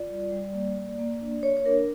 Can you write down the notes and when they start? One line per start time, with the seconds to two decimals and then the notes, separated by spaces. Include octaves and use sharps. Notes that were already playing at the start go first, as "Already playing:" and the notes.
Already playing: F4 D5
0.10 G3
0.32 G3
0.54 A#3
0.76 A#3
0.99 A#3
1.21 D4
1.43 A#3 C#5
1.57 C#5
1.66 D4 A#4